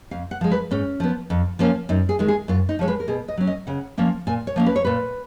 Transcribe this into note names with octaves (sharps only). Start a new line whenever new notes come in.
F2 F5
F#5
F3 G#3
B4
G#2 C#4
F3 B3
F2
F3 A#3 C#4
F#2 D#4
G#4
D#3 G#3
G#4
F#2 F4
D#4
F3 G#3 C#5
B4
A#4
B2 G#4
D#5
F#3 C#4
D#5
C#3 F#5
F3 A#3 C#4
A#2 G#5
C#5
F3 A#3 C#4
B4
C#5
A#2 B4